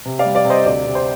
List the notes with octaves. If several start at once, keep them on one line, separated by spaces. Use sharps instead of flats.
C3
D5 F5
G3
D5 F5
C3
C5 D#5
D2 D5
C3
C5